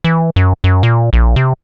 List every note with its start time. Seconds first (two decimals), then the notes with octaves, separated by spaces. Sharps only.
0.04 E3
0.36 F#2
0.64 F#2
0.83 A#2
1.13 A#1
1.36 C3